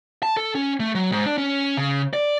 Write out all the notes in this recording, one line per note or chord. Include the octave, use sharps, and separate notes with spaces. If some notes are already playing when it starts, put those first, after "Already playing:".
A5
A4
C#4
A3
F#3
G#2
D4
C#4
C#3
D5